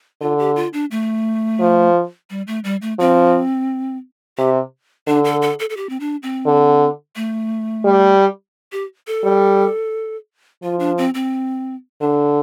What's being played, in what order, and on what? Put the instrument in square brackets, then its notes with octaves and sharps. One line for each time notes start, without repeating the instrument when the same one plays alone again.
[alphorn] D3 [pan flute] F4
[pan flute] G4
F4
D4
A3
[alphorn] F3
[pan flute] G3
A3
G3
A3
[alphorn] F3 [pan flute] C4
[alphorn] C3 [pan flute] G4
[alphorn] D3 [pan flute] D4
[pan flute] A4
A4
A4
A4
G4
C4
D4
C4
[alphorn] D3
[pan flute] A3
[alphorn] G3
[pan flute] G4
A4
[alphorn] G3
[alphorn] F3 [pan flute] F4
[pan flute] D4
C4
C4
[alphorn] D3 [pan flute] D4